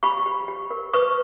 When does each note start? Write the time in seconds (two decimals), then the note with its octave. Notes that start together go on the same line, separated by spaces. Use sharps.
0.03 G4 B5 C#6
0.26 G4
0.48 G4
0.71 A#4
0.93 B4 C#6 D#6